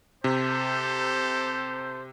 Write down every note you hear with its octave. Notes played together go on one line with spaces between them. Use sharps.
C3 G4 A4 C5